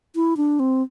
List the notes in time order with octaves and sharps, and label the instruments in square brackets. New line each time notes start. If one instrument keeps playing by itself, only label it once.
[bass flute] E4
D4
C4